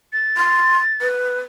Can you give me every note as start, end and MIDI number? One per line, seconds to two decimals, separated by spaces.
0.13 1.07 93
0.37 0.78 84
1.01 1.40 71